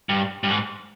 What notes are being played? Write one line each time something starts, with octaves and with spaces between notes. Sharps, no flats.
G2
G2
G#2